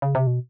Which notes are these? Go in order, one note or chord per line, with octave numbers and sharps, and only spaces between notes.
C#3
C3
B2